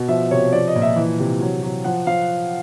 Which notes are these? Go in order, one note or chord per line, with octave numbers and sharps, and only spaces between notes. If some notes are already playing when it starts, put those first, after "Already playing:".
Already playing: B2
F3 E5
C3 C#5
F3 D5
D#5
A#2
E5
E3
C3
F#3
F#3
F3 F#5
F3 F5